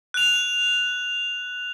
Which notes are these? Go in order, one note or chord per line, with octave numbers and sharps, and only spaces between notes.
F#6 F7